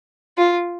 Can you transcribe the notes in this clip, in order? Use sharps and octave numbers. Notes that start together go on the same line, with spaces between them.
F4